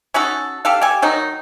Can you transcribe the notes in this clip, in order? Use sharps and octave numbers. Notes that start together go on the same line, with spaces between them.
C#4 D#4 F#4 A4
G4 A4 F5
G4 A4 G#5
D#3 F#3 D#4